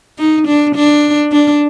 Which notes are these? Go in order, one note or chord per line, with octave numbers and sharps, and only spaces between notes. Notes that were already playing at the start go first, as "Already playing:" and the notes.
D#4
D4
D4
D4